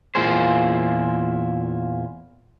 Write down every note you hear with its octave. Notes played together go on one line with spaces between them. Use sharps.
E2 A#2 E4 F4 G#4 C5